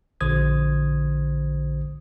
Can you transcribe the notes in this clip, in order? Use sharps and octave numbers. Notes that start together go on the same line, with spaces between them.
A#1 D3 F#4 C5 D#6 G#6